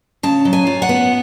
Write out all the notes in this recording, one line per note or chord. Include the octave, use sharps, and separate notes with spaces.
C#3 A5
F#3
G#5
F4
F#5
B3